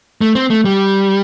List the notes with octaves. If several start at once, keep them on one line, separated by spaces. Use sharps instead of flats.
A3
C4
A3
G3